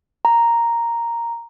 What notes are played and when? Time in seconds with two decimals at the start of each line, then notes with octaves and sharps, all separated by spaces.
0.25 A#5